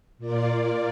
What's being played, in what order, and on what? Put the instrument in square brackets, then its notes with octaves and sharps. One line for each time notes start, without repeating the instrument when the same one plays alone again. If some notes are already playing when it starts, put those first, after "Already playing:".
[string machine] A#2 A#3 F4 D5